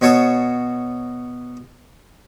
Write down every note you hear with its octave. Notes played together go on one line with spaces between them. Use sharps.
B2 F#4 C#5 A5 D#6